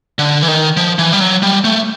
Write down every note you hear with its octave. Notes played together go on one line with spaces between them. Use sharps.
D3
E3
D#3
F3
E3
G3
F#3
G3
A3